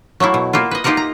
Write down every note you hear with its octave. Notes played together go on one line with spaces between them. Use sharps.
F#3 A3 A#3 E4
B2
A#3 E4 F4
B4 D#5
A#3 D#4 F4 G4 A#4 F#5
A#5